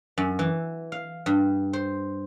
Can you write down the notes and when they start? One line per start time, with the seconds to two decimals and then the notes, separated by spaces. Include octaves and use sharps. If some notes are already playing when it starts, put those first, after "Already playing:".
0.18 F#2
0.39 E3
0.92 F5
1.26 G2
1.73 C5